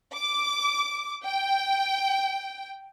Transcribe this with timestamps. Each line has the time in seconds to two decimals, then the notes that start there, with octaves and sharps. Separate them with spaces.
0.15 D6
1.25 G5